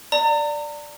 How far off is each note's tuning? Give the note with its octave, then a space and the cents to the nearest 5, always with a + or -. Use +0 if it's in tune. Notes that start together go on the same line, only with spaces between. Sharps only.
D5 +0 A#5 -35